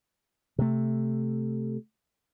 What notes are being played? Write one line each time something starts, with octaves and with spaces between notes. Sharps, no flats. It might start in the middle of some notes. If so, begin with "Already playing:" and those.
C3 A3